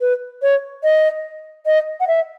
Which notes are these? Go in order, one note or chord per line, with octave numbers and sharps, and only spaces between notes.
B4
C#5
D#5
D#5
F#5
E5